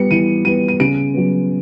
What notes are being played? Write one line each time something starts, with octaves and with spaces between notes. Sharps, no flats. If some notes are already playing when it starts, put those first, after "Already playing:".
Already playing: G3 B3 C#7
E3 D#7
G3 B3 D#7
D#7
C#3 D7
F#3 B3